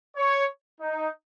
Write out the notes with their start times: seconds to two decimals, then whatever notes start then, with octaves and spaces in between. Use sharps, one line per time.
0.16 C#5
0.81 D#4